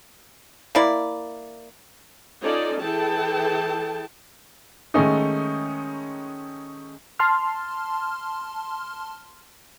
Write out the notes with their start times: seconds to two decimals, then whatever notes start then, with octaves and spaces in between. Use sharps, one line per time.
0.75 A#3 E4 D5
2.42 C#4 D#4 F4 A4 D5 D#5
2.81 E3 E4 G#4 A4 G5 A5
4.94 D#3 G#3 A3 C#4 D#4
7.19 A5 C6 F6